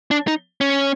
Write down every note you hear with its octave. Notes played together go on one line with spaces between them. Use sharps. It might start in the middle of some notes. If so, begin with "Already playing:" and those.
D4
D#4
C#4